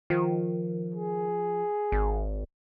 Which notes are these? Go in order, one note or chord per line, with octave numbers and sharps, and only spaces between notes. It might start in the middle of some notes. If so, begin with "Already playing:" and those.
D#3 F3
G#4
G#1